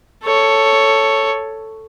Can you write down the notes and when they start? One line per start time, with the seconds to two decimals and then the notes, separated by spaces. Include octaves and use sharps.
0.24 A4 C#5